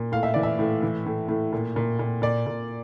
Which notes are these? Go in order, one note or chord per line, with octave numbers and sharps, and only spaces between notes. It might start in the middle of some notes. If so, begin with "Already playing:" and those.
Already playing: A#2
A2 F5
E5
E3 D5
E5
A2
E3
A2
A2
A#2
A#2
A#2
A#2 D5
A#2